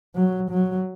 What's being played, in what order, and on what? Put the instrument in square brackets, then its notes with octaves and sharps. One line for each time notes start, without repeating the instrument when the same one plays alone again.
[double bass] F#3
F#3